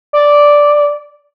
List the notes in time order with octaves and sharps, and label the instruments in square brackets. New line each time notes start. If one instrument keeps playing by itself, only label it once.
[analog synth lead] D5